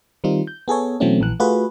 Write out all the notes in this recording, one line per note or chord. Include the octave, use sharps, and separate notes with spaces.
D#3 G3 C4 D#4 F4
G6
B3 G#4 A4 C#5
B2 E3 F#3 A3 C4 C#4
A#1 E3 F#6
A3 F4 F#4 G#4 B4